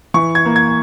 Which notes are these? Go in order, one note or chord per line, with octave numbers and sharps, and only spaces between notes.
E3 C#6
G#6
A#3
G#6